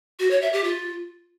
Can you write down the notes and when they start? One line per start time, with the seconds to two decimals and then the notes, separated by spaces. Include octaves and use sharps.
0.19 F#4
0.31 C#5
0.42 E5
0.53 G4
0.64 F4